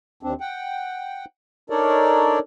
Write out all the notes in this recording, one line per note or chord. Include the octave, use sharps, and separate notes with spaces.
D#2 C4 D4
F#5 G5
D4 D#4 A4 A#4 C#5 D5